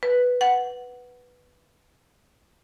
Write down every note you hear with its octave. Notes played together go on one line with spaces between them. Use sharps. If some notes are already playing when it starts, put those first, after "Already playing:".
B4
F#5